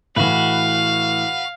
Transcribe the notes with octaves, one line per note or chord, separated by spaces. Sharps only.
A2 E3 F#4 B4 F5